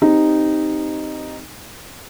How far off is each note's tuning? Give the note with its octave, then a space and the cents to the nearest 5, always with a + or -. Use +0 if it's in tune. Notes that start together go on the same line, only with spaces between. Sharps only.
C4 +0 D#4 -5 G4 +0